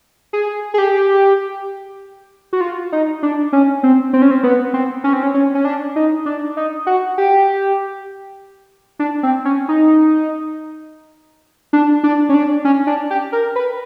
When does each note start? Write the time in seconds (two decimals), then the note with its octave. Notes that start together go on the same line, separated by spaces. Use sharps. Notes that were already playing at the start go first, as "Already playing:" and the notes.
0.33 G#4
0.74 G#4
0.78 G4
2.53 F#4
2.61 F4
2.92 D#4
3.23 D4
3.53 C#4
3.83 C4
4.13 C4
4.22 C#4
4.31 C4
4.43 B3
4.74 C4
5.04 C#4
5.13 C4
5.23 C#4
5.34 C#4
5.54 C#4
5.65 D4
5.96 D#4
6.26 D4
6.57 D#4
6.87 F#4
7.18 G4
8.99 D4
9.23 C4
9.45 C#4
9.68 D#4
11.73 D4
12.04 D4
12.29 C#4
12.34 D4
12.65 C#4
12.87 D4
13.10 G4
13.32 A#4
13.56 B4